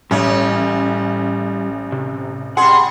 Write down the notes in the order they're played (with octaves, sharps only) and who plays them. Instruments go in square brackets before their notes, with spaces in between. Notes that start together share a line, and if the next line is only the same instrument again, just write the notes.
[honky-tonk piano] A1 [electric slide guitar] G3 [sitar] C#4
[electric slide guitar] C3
[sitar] G3 G#4 [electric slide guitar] F#5 [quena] C6